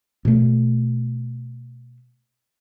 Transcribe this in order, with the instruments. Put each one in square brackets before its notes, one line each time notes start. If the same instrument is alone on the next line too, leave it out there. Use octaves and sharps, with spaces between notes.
[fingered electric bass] B2 A3